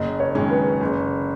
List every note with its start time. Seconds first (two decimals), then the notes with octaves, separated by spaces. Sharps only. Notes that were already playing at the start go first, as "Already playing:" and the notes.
Already playing: F#1 D#5
0.20 C#5
0.35 F#2 D#3 G#3 C#4
0.50 B4
0.81 F#1